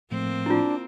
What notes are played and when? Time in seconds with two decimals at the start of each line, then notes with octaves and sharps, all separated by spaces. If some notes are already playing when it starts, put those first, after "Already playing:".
0.11 A2 F3 A3 A#3 C4
0.46 D4 E4 F4